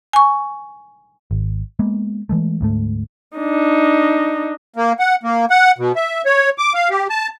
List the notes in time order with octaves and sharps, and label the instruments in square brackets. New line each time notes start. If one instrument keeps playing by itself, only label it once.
[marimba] G#5 C#6
[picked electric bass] G#1
G#3 A#3 B3
E3 G#3 A3
D2 G#2 A3
[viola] D4 D#4
[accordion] A#3
F#5
A#3
F#5
B2
E5
C#5
D6
F5
G4
A5